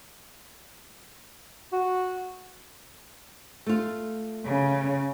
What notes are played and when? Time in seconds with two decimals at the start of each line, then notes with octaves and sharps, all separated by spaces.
1.73 F#4
3.67 A3 F4
4.45 C#3